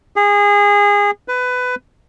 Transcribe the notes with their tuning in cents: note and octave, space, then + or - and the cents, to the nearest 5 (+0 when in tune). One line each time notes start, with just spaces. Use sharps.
G#4 -25
B4 +20